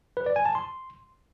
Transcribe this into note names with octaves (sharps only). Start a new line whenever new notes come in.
B4
D5
G#5
A5
C6